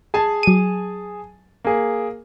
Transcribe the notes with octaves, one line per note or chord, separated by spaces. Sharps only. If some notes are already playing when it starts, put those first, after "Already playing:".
G#4 G#5 A5
F#3 D#7
A#3 G#4